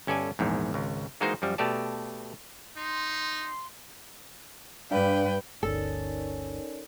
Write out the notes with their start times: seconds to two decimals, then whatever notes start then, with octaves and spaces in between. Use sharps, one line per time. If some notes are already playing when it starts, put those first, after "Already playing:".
0.07 G1 C#4 A4 D5 G#5
0.39 A#1 E2 G#2
0.73 G#1 C#2
1.21 E3 G#3 A#3 D#4 F#4 C5
1.42 F#2 F3 G3
1.58 B2 A3 G4 D5 A5
2.76 D#4 C6
4.91 G2 D4 B4 D5 F5 G5
5.63 G1 D2 C#4 D#4 A4 A#4 D5